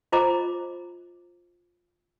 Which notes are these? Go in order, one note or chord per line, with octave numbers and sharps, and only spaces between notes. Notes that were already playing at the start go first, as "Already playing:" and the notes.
F4 C5 D#5 A#5 D6